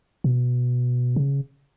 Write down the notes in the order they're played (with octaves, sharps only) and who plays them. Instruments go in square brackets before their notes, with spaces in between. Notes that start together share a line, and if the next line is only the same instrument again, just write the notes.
[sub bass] B2
C#3